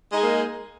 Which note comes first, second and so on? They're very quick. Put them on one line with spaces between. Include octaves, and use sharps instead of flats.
G#3 D#4 G#4 A#3